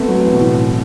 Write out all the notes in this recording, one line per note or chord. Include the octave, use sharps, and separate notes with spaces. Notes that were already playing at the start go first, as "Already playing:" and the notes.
Already playing: A3 B3 C4
F#3
E3
B2
A2